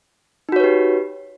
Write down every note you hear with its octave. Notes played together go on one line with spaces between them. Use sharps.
D#4 F#4 G4 B4 C#5